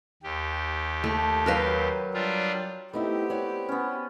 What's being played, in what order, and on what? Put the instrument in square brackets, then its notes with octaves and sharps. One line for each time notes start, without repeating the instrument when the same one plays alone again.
[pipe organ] D#2 G4
[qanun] A3
[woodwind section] F#3 [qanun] A#4 B4 F5
[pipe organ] G3 D4 F4
[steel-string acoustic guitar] A3 D#4 E4 [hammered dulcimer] B3 C4 [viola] G4
[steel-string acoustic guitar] F#4 C#5 D5
[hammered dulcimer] B3 C#4